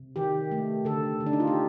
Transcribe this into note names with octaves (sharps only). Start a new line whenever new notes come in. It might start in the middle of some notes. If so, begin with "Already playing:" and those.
Already playing: C3
D#3 G4
A3
D3 A4
D3
D4
D#4
F4
G4